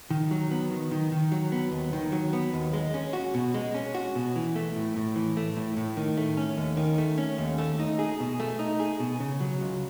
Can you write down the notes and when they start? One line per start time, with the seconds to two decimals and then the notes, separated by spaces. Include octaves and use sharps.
0.10 D#3
0.31 F#3
0.51 B3
0.71 D#3
0.91 D#3
1.12 D#3
1.32 F#3
1.52 B3
1.72 D#2
1.93 D#3
2.12 F#3
2.33 B3
2.53 D#2
2.74 G#3
2.94 C#4
3.13 F#4
3.34 B2
3.54 G#3
3.74 C#4
3.95 F#4
4.15 B2
4.36 E3
4.56 A3
4.76 A2
4.96 A2
5.16 E3
5.37 A3
5.57 A2
5.77 A2
5.97 D#3
6.17 A3
6.37 C#4
6.57 D#2
6.77 D#3
6.98 A3
7.18 C#4
7.38 D#2
7.58 A3
7.79 D#4
7.99 G#4
8.20 B2
8.40 A3
8.59 D#4
8.80 G#4
9.00 B2
9.20 C#3
9.40 F#3
9.61 C#2